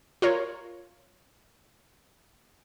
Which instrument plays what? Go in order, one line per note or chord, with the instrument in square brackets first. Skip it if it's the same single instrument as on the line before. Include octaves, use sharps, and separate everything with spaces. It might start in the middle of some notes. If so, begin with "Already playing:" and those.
[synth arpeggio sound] F4 A#4 C#5